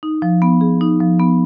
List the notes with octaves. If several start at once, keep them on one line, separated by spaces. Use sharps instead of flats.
D#4
F3
B3
G#4
D#4
F3
B3